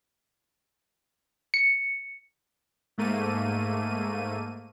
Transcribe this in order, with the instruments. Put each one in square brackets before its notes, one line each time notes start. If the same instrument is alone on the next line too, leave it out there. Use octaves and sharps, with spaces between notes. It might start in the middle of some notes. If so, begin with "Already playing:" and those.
[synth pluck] C#7
[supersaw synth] G#2 A3 A#3 D#7